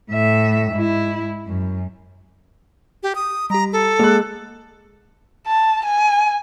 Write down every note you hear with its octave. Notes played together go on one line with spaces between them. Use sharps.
A2 E5
G#2 E4
F#2
G4
D#6
G3 G4 A#5
A4
G#3 A#3 F#6
A5
G#5